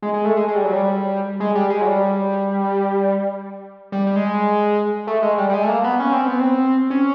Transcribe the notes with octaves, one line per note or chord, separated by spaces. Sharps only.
G#3
G#3
A3
G#3
G#3
G3
F#3
G3
G#3
G3
G#3
F#3
G3
G3
G3
G#3
A3
G#3
G3
G3
G#3
A3
A#3
B3
C#4
C4
B3
C4
C#4